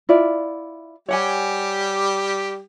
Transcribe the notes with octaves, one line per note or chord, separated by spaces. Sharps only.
E4 F4 D5
G3 G4 C#5 F#5 G#5